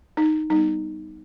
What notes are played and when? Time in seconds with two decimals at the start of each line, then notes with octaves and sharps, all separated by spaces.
0.17 D#4
0.50 G3 B3 D#4